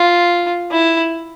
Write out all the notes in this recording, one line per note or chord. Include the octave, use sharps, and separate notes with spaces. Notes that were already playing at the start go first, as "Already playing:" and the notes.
Already playing: F4
E4